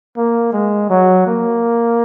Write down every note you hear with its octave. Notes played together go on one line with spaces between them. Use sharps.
A#3
G#3
F#3
A#3